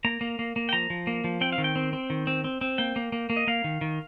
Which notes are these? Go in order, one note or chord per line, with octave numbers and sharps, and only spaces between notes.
A#3 A#5
A#3
A#3
A#3
G5
F3 A#5
F3
A#3
F3
C4 G5
F5
D#3
G5
C4
C4
D#3
C4
C4
C4
A#3 G5
A#3
A#3
A#3
D#5
A#3 F5
D#3
D#3